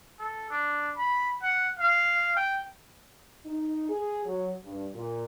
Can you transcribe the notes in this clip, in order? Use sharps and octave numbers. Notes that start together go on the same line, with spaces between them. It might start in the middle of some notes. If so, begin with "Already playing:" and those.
A4
D4
B5
F#5
F5
G5
D#4
G#4
F#3
G2
A#2